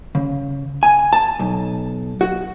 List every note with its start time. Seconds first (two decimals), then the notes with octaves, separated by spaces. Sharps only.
0.15 C#3
0.83 G#5
1.13 A5
1.39 B1
2.21 F#4